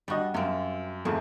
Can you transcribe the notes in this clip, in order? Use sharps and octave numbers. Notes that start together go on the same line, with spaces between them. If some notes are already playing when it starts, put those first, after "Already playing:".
G3 D4 F#4 D#5
F#2 C4 F4
F2 G#2 C3 A3 A#4